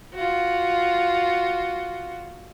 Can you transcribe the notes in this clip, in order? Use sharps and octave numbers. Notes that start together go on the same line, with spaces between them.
F4 F#4